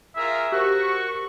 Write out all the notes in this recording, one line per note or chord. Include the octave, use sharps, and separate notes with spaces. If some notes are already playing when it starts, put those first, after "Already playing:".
F4 G#4 A#4 E5
F#4 G4 A#4 C5 C#6